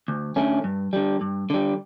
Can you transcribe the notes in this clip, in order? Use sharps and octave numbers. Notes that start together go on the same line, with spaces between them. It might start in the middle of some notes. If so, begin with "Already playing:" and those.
D2
D3 A3 C#4
G2
D3 G3
G2
D3 G3